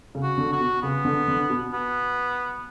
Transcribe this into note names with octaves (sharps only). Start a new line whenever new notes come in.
C#3
F#4
D3
F#4
B2
C#3 B3
D3
D3
B2
B3